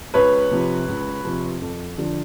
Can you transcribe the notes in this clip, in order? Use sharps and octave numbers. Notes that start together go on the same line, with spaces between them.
C#2 B4 C#5
C3 F3
C#2
C3 F3
F2
D3 F3